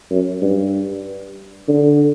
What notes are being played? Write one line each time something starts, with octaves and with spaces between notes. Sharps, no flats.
F#2
G2
D3